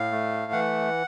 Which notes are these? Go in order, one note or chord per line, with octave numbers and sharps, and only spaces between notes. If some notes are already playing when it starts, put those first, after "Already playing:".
Already playing: A2 F5
A3
E3 F#5